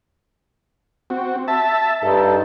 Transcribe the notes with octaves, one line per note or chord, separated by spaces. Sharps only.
C4 F#4
E5 A5
G2 D#4 A4